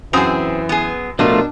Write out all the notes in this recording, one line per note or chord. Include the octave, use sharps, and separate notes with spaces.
F#2 E3 C4 G#4 D#6
B3 G#4
B2 F3 A3 D4 F4 A#4